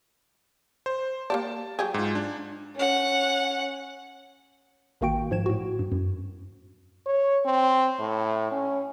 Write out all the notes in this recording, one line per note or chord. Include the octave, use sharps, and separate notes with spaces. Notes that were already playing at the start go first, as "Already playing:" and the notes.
C5
A#3 G4 D5 A5
F#3 G4 G#4
G#2 F4
D4
C#4 F#5
A1 D#3 A#3 F#4 G5 D7
G#2 F3 G#6 E7
A2 F#4
G2
F#2
C#5
C4
A2
C#4